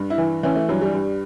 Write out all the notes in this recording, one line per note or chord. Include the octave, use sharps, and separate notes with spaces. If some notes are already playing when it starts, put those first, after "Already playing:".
Already playing: G2
E4
E3
E3 C#4
A3
G2 F#3
G3
G2